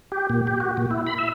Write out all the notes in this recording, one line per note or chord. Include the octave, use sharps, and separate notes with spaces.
G4
A#2
G4
F#4
A#2
E4
B5
E5